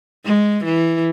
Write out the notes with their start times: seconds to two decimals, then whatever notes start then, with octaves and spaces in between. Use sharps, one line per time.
0.25 G#3
0.64 E3